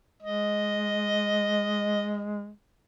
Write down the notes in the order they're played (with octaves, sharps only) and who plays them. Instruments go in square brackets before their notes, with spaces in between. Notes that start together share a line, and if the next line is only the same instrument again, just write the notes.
[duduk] G#3 [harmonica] D#5